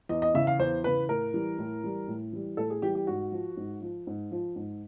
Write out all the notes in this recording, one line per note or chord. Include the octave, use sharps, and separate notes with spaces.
E2 D#5
D#5
C#3 E3 E5
F5
E2 C5
C#3 E3 B4
A2 A#4
E3 G3
A2
E3 G3
A2
E3 G3
A2 A4
G#4
E3 G3 G4
G4
G#2 F#4
F3
G#2
F3
G#2
F3
G#2